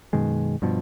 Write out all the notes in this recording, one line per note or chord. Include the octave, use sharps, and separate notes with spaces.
F#2 B2 D#3 G#3
G2 B2 F3